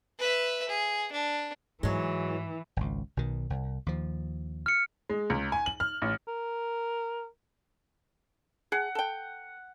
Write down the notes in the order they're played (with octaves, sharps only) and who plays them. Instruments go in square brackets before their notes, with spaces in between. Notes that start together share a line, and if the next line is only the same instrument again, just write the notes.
[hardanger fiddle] B4 E5
G#4
D4
[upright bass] G#2 [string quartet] E3 [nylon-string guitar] F#3 G#3
[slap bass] G#1 C#2
B1 B2 D#3
C2
D#2 F3
[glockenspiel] F6 C#7
[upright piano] G#3
C#2
G#5
F#7
F6
A1
[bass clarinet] A#4
[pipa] G#4 [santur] F#5
[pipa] A4 G5